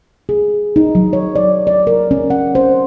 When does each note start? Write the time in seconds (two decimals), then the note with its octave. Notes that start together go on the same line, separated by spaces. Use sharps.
0.29 G#4
0.76 D#4
0.95 F#3
1.13 C#5
1.36 D5
1.67 D5
1.87 A#4
2.11 C#4
2.30 F#5
2.55 C5